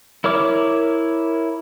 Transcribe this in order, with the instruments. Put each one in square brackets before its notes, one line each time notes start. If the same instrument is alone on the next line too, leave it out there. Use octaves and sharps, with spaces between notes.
[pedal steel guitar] E4 A#4 C#5 D6 F6